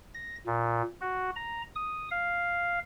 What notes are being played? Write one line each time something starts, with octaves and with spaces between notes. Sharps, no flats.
A#6
A#2
F#4
A#5
D#6
F5